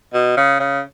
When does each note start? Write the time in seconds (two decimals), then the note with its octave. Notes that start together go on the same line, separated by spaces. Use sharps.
0.14 B2
0.37 C#3
0.60 C#3